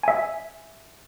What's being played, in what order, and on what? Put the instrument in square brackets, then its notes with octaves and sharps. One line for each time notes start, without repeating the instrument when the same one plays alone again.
[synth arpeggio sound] E5 G#5